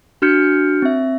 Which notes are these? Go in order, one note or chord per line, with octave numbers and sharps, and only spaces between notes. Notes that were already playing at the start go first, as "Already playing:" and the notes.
D4 F#4 F6 G6 C#7
C4 E5